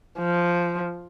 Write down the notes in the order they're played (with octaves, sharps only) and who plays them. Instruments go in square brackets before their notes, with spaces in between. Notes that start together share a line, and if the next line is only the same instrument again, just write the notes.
[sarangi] F3